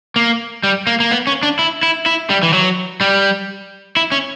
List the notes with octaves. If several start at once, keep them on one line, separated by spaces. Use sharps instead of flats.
A#3
G3
A#3
A#3
B3
C#4
D4
E4
E4
E4
G3
E3
F#3
G3
E4
C#4